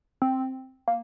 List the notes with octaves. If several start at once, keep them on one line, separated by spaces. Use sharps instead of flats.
C4
A#3